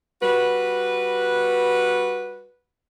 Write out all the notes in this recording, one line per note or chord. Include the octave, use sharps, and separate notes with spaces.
G3 F#4 B4